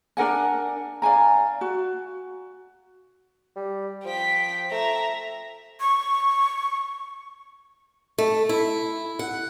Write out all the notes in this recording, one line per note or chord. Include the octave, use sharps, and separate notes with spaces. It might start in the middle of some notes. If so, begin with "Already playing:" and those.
D4 A#4 F#5 G#5
D5 F5 G#5 A#5
F#4
G3
F3 G5 B6
A3 E5 A#5
C#6
A3
E4
F#5